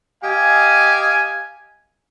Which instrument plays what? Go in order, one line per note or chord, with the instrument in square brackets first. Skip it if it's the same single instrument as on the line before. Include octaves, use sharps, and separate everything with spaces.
[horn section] G4 D#5 F5 G#5